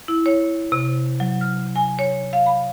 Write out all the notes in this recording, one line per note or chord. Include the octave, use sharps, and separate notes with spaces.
E4
C#5
C3
F#3
F6
G#5
C#5
F5
B5